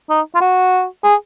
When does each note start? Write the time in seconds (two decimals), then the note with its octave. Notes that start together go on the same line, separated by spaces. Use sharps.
0.10 D#4
0.35 F4
0.41 F#4
1.04 G#4